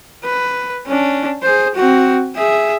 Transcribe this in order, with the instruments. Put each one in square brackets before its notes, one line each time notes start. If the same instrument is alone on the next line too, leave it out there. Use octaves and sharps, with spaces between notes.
[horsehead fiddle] B4
C#4 D4
G#4 C5
C4 F#4
G#4 E5